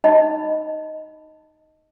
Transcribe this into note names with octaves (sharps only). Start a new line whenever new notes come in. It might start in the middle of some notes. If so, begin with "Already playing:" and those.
D#4 D#5 B5